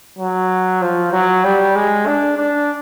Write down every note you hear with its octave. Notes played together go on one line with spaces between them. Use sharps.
F#3
F3
F#3
G3
G#3
D4
D4